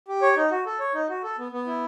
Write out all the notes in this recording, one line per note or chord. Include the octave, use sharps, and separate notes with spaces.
G4
C#5
D#4
F#4
A4
C#5
D#4
F#4
A4
B3
B3
E4